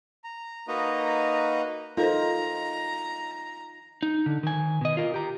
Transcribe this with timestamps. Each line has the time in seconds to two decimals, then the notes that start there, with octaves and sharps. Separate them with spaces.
0.24 A#5
0.68 A#3 D#4 F#4 B4 D#5 A#5
1.97 D#4 F4 A4 A#4 C5 A#5
4.03 D#4
4.26 D3
4.43 D#3 G#5
4.81 B2 D#5
4.97 F4 A#4
5.14 G4 A#5